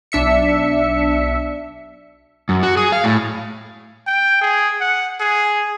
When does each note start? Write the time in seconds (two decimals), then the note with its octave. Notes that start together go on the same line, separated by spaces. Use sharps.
0.12 B1 D4 E5 C#7
2.49 F#2
2.63 F#4
2.77 G#4
2.92 F5
3.04 A2
4.07 G5
4.42 G#4
4.81 F#5
5.20 G#4